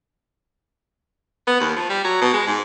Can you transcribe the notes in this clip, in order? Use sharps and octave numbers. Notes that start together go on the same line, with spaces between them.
B3
D#2
F3
G3
F#3
B2
G#3
G#2